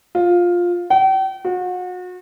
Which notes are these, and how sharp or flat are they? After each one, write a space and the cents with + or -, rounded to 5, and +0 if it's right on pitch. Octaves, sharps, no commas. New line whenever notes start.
F4 +10
G5 -40
F#4 -35